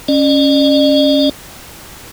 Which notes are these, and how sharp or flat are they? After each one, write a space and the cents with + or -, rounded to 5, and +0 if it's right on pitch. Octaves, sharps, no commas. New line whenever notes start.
C#4 +0 D5 +45